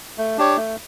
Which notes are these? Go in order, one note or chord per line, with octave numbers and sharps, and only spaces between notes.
A3
D4 G4 C#5
A3